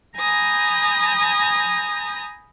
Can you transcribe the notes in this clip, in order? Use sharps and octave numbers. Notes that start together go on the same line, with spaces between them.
G#5 A#5 B5 D#6 G6